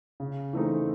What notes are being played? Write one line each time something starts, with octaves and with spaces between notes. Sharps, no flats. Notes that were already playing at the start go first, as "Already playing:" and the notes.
C#3
E3 A3 C4 D#4